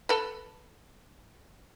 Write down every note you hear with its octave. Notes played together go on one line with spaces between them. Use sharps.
A4 B4